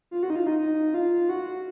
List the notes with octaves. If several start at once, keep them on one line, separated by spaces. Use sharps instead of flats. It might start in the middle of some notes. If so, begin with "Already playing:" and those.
F4
F#4
D#4
F4
D#4
D#4
F4
F#4